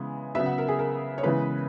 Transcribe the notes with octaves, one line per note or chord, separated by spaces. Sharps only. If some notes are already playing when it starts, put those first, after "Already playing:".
Already playing: C#3 E3 G#3 B3
C#3 F#3 B3 E5
F#5
A#4
G#4
A#4
C#5
C#3 E3 G#3 B3 B4